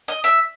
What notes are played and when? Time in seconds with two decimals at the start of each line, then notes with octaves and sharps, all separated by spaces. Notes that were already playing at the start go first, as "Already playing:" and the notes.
0.08 D#5
0.24 E5